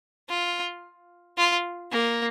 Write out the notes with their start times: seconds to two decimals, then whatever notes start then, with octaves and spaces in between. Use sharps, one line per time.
0.29 F4
1.38 F4
1.91 A#3